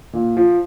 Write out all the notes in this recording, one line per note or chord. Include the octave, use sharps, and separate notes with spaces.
A#2
F3